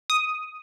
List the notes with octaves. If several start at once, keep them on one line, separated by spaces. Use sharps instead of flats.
D#6